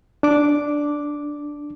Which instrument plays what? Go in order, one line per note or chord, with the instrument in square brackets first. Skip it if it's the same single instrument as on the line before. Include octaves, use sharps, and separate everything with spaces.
[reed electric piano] D4 D6